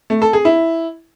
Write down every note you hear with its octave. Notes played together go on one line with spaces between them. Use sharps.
A3
A4
G#4
E4